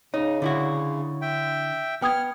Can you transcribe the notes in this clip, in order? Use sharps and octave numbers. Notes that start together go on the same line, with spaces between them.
C#3 D#4 C#5
D3 E4 F#4
E5 G5
B3 G5 D#6 F6 G#6